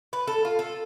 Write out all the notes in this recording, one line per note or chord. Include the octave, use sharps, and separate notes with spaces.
B4
A4
F4
A4